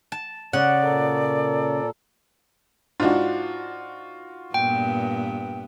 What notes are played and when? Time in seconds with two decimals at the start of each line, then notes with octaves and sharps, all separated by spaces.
0.12 A5
0.53 C#3 D5 F#5
0.82 A#2 A4 A#4
3.00 G#2 D4 F4 F#4
4.54 G2 A#2 B3 G5